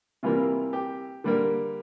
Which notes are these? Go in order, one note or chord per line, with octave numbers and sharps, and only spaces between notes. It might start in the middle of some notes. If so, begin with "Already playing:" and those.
C3 E3 G3 A#3 F4
G4
D3 G3 A#3